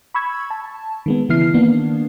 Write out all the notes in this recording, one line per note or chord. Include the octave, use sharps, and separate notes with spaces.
B5 C#6 E6 G#6
A5
D#3 G#3 B3
C#3 E3 B3 E4 F6 C7
D#3 A#3 B3 D4